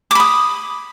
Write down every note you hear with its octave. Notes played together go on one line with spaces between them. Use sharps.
B5 D6 D#6